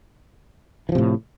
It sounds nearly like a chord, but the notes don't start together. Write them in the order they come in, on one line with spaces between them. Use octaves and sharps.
E3 F3 C3 A2